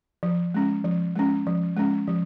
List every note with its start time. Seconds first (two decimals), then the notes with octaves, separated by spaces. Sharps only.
0.23 F3
0.54 G#3 C#4
0.85 F3
1.15 G#3 C#4
1.47 F3
1.77 G#3 C#4
2.07 F3